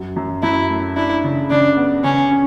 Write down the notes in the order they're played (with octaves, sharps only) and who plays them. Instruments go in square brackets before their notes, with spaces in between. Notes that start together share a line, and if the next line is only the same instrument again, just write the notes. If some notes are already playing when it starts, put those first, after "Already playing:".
Already playing: [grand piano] F#2 F#3
F#2
[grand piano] F#2 [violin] E4
[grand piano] A3
[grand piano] D4 [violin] E4
[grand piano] C#3
[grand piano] C#3 [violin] D4
[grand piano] B3
[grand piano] C#3 [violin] C#4
[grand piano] C#4